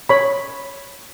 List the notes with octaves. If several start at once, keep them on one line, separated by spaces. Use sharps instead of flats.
C#5 B5